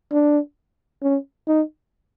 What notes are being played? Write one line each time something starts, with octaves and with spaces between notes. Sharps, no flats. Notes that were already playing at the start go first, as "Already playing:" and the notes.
D4
C#4
D#4